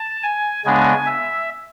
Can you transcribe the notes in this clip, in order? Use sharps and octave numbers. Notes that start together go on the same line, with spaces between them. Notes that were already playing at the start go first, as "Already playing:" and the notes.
Already playing: A5
G#5
C#3 G#3 B3 D4 G#5
E5